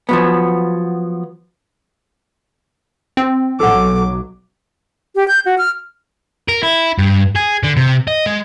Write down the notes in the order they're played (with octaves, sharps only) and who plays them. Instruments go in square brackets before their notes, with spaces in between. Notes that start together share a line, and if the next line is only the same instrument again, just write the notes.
[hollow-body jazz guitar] F3 F#3 B3
[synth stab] C4
[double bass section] B1 F#3 [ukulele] A4 F#5 [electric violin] D6
[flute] G4
G6
F#4
F6
[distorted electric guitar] A#4
E4
G2
G#4
D3
C3
D#5
G#3